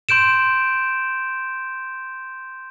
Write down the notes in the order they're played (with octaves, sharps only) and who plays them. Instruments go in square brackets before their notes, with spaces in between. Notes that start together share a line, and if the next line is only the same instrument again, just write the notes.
[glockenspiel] C6 G6 D7 E7